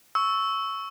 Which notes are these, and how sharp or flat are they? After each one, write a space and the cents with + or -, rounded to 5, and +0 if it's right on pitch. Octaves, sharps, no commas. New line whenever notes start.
C#6 +0 E6 -10